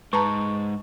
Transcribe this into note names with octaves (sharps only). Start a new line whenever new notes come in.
G#2 B4 A5 A#5 C#6